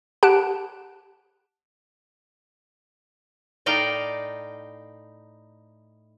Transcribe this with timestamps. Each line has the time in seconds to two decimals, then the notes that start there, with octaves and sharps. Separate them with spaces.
0.23 G4 F#5 A5 F#6 D7
3.66 A2 D#4 D5 F5 G5